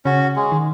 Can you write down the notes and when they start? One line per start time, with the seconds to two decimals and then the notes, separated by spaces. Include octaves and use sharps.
0.05 C#3 C#4 F#4
0.36 G#3
0.52 D#3